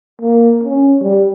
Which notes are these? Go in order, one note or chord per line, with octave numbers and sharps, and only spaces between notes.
A#3
C#4
G3